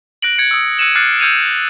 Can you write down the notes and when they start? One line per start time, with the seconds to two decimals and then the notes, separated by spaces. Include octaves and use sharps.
0.22 F#6 A#6 D7 F#7
0.38 G#6 C#7
0.51 D#6 E6
0.78 E6 F#6 C#7 D#7 E7 F#7
0.95 D6 F6 F#6 A6 C7 C#7
1.20 E6 G6 G#6 C#7 D#7 F7